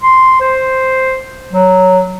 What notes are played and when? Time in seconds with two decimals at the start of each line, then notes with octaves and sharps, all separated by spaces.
0.02 C6
0.40 C5
1.53 F#3